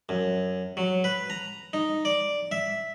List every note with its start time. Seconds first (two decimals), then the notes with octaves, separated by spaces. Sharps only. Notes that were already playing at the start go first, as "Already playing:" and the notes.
0.09 F#2
0.77 F#3
1.04 B4
1.30 A#5
1.73 D#4
2.05 D5
2.52 E5